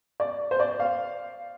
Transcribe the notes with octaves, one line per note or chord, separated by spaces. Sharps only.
D5
C5
D5
F5